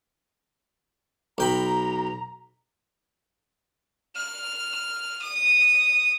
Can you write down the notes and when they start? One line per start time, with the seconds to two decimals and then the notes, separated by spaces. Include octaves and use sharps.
1.38 B1 G5 A#5 B5
4.16 F6
5.22 D#6